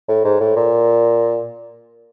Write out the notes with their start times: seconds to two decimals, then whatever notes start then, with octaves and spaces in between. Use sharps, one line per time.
0.08 A2
0.24 G#2
0.40 A2
0.56 A#2